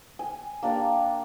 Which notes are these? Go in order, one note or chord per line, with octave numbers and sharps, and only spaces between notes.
G#5
A#3 D4 G4 D5